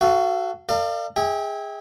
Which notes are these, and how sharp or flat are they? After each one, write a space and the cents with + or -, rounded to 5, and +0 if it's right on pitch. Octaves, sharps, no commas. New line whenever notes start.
F#4 +10 A4 +0 F5 -30
A#4 -40 D5 +35 F5 -20
G#4 -15 E5 -35 G5 +10